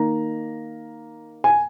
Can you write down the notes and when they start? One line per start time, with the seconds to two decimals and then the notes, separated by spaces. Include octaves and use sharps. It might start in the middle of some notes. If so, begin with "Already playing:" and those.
Already playing: D#3 A#3 D#4 A#5
1.44 G#5